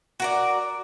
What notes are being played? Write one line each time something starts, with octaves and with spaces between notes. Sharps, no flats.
F#4 A#4 D5